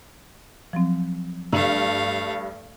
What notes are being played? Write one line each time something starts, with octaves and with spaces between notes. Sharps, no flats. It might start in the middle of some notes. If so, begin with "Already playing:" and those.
F3 F#3 C4
G2 A3 F5 E6